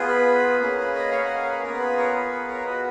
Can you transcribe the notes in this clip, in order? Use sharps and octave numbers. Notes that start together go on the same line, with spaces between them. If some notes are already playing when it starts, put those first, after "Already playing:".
Already playing: B3 F4 G#4
B4
A#3 C#4 G#4 B4
B4
B4 D#5
C#5 F5
D#5 F#5
F5 G#5
C#5
B4
B3 F4 G#4 A#4
B4
A#4 C#5
B4
B4
A#4 C#5
B3 F#4 B4 D#5